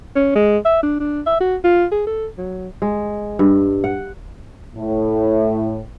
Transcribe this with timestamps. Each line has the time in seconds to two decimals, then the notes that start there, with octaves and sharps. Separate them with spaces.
0.16 C#4
0.36 G#3
0.65 E5
0.83 D4
1.00 D4
1.26 E5
1.41 F#4
1.64 F4
1.92 G#4
2.07 A4
2.38 F#3
2.82 G#3
3.39 G2
3.84 F#5
4.76 A2